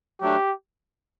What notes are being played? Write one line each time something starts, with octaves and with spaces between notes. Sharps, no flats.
F#3 A3 D4 G4